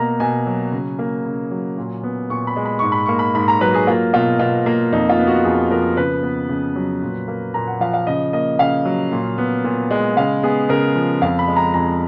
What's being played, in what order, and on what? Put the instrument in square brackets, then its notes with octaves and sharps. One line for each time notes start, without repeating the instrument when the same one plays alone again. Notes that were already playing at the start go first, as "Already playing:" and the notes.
Already playing: [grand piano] B2 A#3 A#5
B2 G#5
F#3
C#3
A#3
C#3
F#3
A#2
B3
A#2 C#6
B5
G#3
B5
G#2 C#6
B5
A#3 C#6
B5
G#2 B5
A#5
F#3 B4
G#4
A#3 F4
B2 F4
B2 F4
A#3
F2 D#4
F4
B3
F#4
F2 G#4
F3 A#4
C#3 B4
B3
C#3
F#3
A#2
A#3
A#2 A#5
F#5
F3 F5
F5
C#3 D#5
A#3 D#5
C#3 F5
F#3
A#2
B3
A#2
G#3
C#3 F5
B3 G#4
C#3 A#4
F3
F2 F5
B5
G#3
A#5
F2 A#5